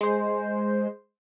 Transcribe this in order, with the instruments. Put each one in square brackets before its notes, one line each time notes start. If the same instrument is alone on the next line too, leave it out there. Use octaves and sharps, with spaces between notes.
[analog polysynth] G#3 C5